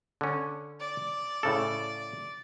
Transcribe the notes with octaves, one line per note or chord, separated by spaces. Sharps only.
D3 C#4
D5
A2 C#3 A4